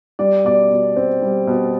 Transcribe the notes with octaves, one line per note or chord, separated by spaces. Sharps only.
G3 D5
B2 D5
B2
C4
G3
B2